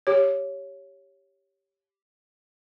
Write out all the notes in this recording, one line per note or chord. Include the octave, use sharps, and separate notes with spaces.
G4 C#5